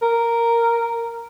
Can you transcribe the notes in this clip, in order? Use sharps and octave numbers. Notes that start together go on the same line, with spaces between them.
A#4